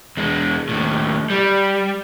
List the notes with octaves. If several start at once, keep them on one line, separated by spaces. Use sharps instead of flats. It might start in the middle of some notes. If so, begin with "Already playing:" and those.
E2 G#3
D#2 A2
G3